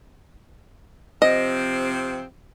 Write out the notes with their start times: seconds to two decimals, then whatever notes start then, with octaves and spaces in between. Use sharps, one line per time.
1.22 C3 F3 C4 D#5